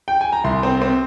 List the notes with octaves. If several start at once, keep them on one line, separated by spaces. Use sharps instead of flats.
G5
G#5
A#5
C2 C6
C4
C4